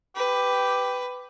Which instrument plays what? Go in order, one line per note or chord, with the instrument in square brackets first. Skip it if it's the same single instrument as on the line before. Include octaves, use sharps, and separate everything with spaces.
[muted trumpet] G4 [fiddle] B4